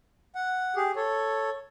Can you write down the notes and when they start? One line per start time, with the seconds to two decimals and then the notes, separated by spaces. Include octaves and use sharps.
0.35 F#5
0.76 G4 G#4
0.96 A4 C#5